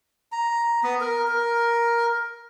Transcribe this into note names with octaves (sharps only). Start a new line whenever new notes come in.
A#5
B3
A#4
A#4